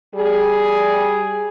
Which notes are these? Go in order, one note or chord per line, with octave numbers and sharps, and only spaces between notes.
G3 G#4